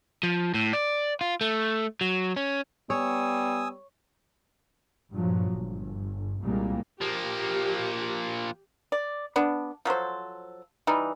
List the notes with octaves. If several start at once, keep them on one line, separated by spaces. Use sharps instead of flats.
F3
A2
D5
F4
A3
F#3
C#4
G3 B3 C#5 G#5 D#6 E6
G2 A#2 F3 F#3
G1
C2 A#2 G3 G#3 A#3
F3 A#3 G4
D5
B3 D4
F3 F#3 A4 C5
E3 G3 D#4